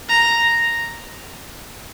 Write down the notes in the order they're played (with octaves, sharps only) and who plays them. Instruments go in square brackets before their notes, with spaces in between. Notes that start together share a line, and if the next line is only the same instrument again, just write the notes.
[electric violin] A#5